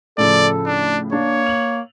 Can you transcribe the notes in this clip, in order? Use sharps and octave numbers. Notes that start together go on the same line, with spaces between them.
A2 C#3 F3 A4 D5
D4
A#3 D4 C#5
F7 F#7